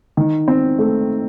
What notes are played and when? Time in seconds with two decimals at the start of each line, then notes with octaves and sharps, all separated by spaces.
0.17 D#3
0.48 C4
0.79 A3